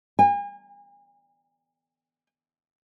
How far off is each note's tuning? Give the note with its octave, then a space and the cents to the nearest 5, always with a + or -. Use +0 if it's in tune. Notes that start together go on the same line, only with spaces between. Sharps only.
G#5 -40